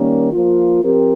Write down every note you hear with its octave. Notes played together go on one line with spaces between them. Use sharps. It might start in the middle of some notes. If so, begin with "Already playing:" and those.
Already playing: D#3 G3 A#3 C#4
F3 A#3 F4
F3 C4 G4 A#4